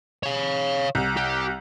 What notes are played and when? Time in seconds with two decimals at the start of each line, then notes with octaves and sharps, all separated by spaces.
0.23 C#5 F5
0.95 C2
1.16 G4